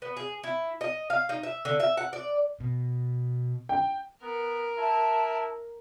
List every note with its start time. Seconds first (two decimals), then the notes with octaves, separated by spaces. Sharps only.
0.02 B3
0.17 G#4
0.43 E4
0.81 D#5
1.10 F5
1.29 D#4
1.43 E5
1.65 D3
1.80 E5
1.97 F#5
2.13 D5
2.60 B2
3.69 G5
4.22 B3 A#4
4.78 E4 A5